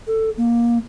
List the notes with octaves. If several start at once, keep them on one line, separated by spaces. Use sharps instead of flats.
A4
A#3